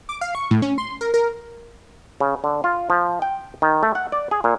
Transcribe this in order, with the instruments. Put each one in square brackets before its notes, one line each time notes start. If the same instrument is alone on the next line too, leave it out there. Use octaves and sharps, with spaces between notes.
[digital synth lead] D6
F5
C#6
A2
C#4
C6
A#4
A#4
[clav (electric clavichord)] C#3
D3
F4
F3
G5
D#3
A3
F#5
D5
G#4
A#2